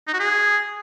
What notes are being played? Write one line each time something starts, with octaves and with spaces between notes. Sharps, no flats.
D#4
F#4
G#4